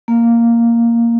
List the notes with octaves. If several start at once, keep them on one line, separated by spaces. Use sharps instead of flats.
A#3